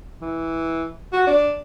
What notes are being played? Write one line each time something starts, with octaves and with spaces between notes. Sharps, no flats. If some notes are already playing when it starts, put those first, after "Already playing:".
E3
F#4
D4